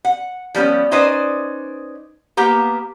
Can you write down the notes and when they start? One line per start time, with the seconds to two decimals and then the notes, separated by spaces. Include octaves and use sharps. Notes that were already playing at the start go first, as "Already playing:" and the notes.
0.05 F#5
0.55 F3 G3 B3 C#4
0.91 C#4 D#4 B4 C5 D5 D#5
2.37 A#3 B3 G4 A#5